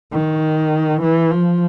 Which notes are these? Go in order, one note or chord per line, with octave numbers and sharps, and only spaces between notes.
D#3
E3
F3